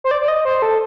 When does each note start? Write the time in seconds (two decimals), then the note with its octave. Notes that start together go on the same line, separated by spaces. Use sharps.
0.04 C5
0.11 D5
0.21 D5
0.28 D#5
0.45 C5
0.62 A4